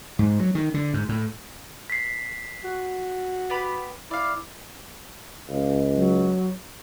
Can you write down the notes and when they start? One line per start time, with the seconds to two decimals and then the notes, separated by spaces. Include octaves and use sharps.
0.19 G#2
0.39 F#3
0.55 D#3
0.74 D3
0.94 G#2
1.09 A2
1.90 B6 C7
2.64 F#4
3.50 B3 G4 B5
4.11 E4 D5 F5
5.50 C#2 F5
5.95 F#3